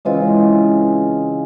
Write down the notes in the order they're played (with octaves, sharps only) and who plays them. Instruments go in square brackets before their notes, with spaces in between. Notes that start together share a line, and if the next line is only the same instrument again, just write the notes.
[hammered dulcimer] C#3 E3 G#3 C4 F4